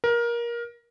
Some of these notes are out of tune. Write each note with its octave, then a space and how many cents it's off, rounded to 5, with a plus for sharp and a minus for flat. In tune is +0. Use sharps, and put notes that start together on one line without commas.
A#4 +20